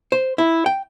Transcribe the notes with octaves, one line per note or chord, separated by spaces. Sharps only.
C5
E4
G5